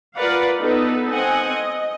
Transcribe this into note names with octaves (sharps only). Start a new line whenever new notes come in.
F4 A#4 B4 D5 F5 F#5
B3 D#4 A4 B4
C4 D#5 F#5 G#5
D#5